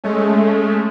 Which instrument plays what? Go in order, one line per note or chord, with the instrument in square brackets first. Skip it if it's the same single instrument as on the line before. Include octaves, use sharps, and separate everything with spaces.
[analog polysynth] G#3 A3 C#4